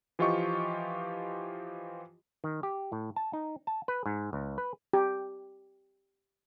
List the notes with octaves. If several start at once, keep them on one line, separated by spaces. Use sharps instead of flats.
E3 F3 F4 G4 D#5 C#6
D#3
G4
A2
A5
D#4
A5
B4
G#2
C#2
B4
G4